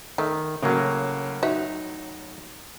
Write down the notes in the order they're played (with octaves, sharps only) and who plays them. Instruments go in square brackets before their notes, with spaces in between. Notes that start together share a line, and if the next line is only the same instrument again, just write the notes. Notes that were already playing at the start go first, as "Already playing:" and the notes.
[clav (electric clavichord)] D#3 [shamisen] A3
[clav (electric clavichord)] A2 F#3 [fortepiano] C#3 A#3
[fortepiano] D#4 [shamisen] F#4 E5